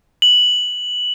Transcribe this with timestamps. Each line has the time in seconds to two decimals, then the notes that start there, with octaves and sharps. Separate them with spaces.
0.22 F#7